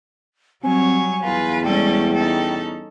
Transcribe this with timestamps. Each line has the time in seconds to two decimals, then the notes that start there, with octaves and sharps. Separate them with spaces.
0.64 F#3 G3 C4 C#5 G#5
1.24 E2 F4 B4
1.64 G3 G#3 C#4 A4 G5
2.15 C#4 D#4 A4